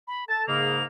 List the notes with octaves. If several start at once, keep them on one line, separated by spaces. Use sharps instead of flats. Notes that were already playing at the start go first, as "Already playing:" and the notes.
B5
A4 A5 A6
G#2 C#3 A#3 F7